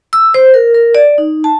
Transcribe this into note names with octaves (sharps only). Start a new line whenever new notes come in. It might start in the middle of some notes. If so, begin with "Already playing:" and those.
E6
C5
A#4
A#4
D5
D#4
A5